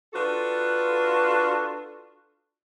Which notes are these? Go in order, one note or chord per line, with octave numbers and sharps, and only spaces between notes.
D4 F4 F#4 A4 B4